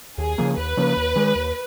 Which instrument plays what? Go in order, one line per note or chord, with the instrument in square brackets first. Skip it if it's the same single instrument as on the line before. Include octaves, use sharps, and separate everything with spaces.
[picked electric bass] D#2 [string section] G#4
[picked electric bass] C#3 F3 A#3
[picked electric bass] D#2 [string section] B4
[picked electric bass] C#3 F3 A#3
D#2
D#3 G#3
D#2